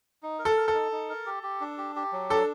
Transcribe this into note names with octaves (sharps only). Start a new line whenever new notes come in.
D#4
A#4
A4
A#4
A4
D#4
D#4
A#4
G4
G4
D4
G4
G4
F#3
D4 A4